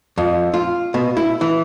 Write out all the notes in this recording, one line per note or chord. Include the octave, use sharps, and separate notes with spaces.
F2
F4
B2
E4
E3